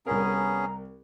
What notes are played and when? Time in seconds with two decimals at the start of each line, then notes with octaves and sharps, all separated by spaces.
0.07 C2 B3 C#4 G#4 A#4 A#5